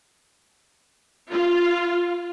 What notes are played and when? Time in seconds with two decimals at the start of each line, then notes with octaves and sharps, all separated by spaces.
1.30 F4